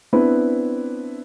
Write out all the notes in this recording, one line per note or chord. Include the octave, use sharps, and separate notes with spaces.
B3 C4 D4 E4 B4